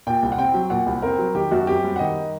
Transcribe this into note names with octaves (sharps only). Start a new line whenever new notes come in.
A#2 G5
C2
F#5
C4 G5
F#3
A#2 F#5
C2
C4 A#4
F#3
D#3 G4
F#2 F#4
C4 G4
G3
F#5
D#3 D#5